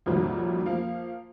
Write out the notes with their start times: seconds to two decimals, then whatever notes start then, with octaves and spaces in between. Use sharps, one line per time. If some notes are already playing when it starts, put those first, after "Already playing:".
0.06 C2 F2 A#2 D#3 F#3
0.65 F3 A#3 F5